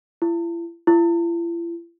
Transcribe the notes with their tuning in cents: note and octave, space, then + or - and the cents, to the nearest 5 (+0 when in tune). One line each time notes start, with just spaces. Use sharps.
E4 +40
E4 +45